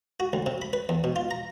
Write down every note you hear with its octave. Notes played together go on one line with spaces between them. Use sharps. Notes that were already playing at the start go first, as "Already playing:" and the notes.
F#4
D2
C3
B5
B4
E2
B2
F4
A#5